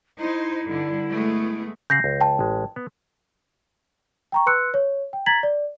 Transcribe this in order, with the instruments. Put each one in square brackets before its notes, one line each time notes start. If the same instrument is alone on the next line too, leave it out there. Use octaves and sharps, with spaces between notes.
[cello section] D#4 C5 [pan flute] E4
[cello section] G2 D3
G#3 A3 B3
[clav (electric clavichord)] C#3 F#5 [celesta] G6 A#6 C7
[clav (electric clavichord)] C#2
[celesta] G5 A5
[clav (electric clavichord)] A1 G#3
B3
[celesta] G5 A#5 C#6
B4 C6 E6 F#6 C#7
C#5
G5
A#5 G#6 A6 B6 F#7
D5